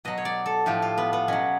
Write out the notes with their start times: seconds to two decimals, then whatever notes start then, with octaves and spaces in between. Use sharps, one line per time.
0.05 B2 F#3 D#5
0.18 C#5
0.25 D5
0.46 A4
0.66 A2 F3 G4
0.82 F4
0.98 B3
1.13 B3
1.28 B2 F#3 C#4